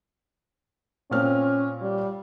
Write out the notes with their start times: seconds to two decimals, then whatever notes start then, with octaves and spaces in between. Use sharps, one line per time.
1.11 A#2 C4 C#4 F6
1.81 G3